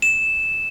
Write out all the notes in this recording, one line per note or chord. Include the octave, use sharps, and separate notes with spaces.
E7